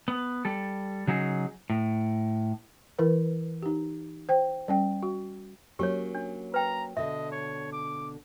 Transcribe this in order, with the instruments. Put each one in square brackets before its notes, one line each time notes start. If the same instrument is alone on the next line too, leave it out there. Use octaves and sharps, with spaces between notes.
[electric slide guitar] B3
G3 A4
C#3 F#3 D#4 G#4
A2
[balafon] E3 E4 A#4 B4
D#4 G4
C5 G5
G3 C#4 G5
F#4
[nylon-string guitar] F#3 A#3 C#4 [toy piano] G4 C#5
[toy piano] D4
[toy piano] B4 G5 [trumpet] A#5
[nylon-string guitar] B2 D3 [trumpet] D#5 [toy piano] E5
[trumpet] C#5
D6